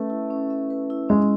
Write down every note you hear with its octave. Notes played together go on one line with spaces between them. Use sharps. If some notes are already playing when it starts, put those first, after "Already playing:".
Already playing: A3 C#4 B4 E5
E4
C#4
E5
B4
E4
G#3 C#4